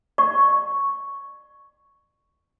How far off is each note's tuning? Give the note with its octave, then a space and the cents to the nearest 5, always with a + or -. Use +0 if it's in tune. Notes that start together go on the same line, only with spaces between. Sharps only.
D5 +35 C#6 +0